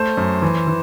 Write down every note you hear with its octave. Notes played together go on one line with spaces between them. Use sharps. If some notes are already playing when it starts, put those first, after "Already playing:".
Already playing: A3 C5
F#2
E3
E3